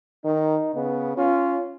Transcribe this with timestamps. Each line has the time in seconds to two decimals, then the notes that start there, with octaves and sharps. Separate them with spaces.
0.24 D#3 D#4
0.75 C#3 B3
1.18 C#4 F4